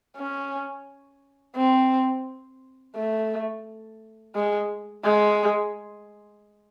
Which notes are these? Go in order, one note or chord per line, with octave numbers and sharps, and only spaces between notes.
C#4
C4
A3
G#3
G#3